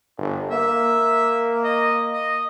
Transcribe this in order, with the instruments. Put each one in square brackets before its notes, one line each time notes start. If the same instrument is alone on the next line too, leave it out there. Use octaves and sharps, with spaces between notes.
[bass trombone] G1
[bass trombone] A#3 [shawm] E5
[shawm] D#5
D#5